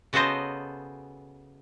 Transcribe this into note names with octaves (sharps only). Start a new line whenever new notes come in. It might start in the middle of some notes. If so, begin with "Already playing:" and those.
C#3 B3 F#4 A4 C5 D#5